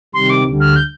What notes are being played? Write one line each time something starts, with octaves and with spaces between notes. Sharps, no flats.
C3 D#3 G3 C6
D6
D2 D3 G3
F6
G6